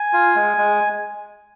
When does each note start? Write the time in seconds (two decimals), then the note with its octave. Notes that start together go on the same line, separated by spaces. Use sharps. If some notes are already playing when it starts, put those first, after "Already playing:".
Already playing: G#5
0.13 F4
0.35 G#3
0.57 G#3